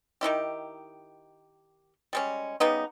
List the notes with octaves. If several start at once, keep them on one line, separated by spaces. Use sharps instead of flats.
D#3 D#4 E4 G4
G3 G#3 C#4
C#3 G3 B3 D#4